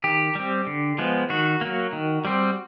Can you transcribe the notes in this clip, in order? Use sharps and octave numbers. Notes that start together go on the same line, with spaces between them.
D#3 G4
G3 C4
D3
F3 G#3 B3
D#3 F#4
F#3 A#3
D#3
G3 C4